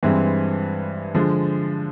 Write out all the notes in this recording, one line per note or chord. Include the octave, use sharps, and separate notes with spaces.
G2 E3 G#3 C4
D3 F3 G#3